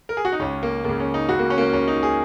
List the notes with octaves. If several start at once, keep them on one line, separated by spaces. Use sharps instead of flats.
A#4
G#4
F#4
D#4
C#2 C#3 C#4
A#3
C#2 C#3 A#3
C#4
D#4
C#2 C#3 F#4
A#3
C#4
A#3
C#4
C#2 C#3 C#4
D#4
G#4